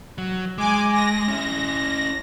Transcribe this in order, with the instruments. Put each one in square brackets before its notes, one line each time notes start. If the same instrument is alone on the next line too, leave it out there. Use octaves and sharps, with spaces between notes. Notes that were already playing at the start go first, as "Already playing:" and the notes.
[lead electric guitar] F#3
[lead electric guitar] G#3 [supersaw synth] G#5 D6
[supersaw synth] A#6
[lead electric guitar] C#4 E4